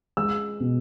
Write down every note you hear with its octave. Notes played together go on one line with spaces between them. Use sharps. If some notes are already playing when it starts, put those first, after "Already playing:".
G#3 E6
B2